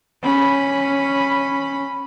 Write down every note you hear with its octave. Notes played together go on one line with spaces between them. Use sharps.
C#4 B5